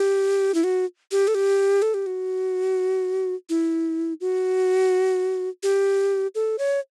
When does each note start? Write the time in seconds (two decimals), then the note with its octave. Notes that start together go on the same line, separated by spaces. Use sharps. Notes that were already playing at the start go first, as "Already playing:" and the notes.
Already playing: G4
0.54 E4
0.64 F#4
1.12 G4
1.27 A4
1.34 G4
1.82 A4
1.94 G4
2.06 F#4
3.49 E4
4.20 F#4
5.63 G4
6.35 A4
6.58 C#5